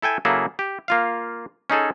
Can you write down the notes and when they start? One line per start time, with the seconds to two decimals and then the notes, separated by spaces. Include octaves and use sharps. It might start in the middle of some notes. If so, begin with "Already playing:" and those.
0.02 E4 A4 G5 G#5
0.25 C#3 F#3 A#3 E4 G#4 A4
0.59 G4
0.88 A#3 F4 F5
1.70 C#4 D#4 G#4 A4